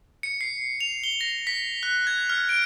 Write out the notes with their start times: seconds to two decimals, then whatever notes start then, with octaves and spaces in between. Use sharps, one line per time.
0.23 C#7
0.41 C7
0.81 F7
1.04 G7
1.21 A#6
1.47 B6
1.83 F#6
2.07 G#6
2.30 F6
2.49 D7